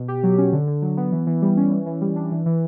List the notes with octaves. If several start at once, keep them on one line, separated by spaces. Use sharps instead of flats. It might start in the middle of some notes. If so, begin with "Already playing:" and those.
Already playing: B2
G4
F#3
C#4
D3
D3
F#3
B3
E3
E3
G3
C#4
E3
E3
G3
D4
E3
E3